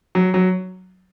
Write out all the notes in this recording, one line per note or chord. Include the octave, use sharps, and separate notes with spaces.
F#3
F#3